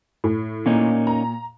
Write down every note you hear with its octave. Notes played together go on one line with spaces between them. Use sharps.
A2
A#2 A#3 C#4 D#4
A#5